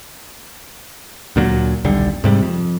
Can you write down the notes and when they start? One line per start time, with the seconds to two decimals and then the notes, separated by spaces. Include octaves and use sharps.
1.36 D2 A#2 F#3
1.84 D#1 B1 D3 G3
2.24 G#2 C3 G3
2.42 F2